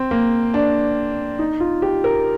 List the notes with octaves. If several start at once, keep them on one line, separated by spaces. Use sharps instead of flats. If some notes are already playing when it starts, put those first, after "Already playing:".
Already playing: C4
A#3
D4
D#4
F4
G4
A#4